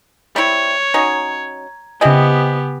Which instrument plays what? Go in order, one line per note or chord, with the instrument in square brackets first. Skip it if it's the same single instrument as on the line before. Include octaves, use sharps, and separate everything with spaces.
[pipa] G3 C4 E4 [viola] C#5
[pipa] F#3 C#4 D#4 [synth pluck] A#5 G#6
[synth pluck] C#3 G#5 [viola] B3 G4 [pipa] C4 E4 D#5